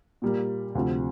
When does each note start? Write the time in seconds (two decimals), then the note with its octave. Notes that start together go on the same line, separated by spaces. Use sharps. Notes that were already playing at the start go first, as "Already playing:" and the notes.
0.22 A#2 G3 A#3
0.75 D2 C3 F3